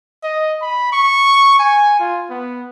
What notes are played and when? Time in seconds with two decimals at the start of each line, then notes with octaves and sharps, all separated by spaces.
0.23 D#5
0.62 B5
0.93 C#6
1.59 G#5
2.00 F4
2.30 B3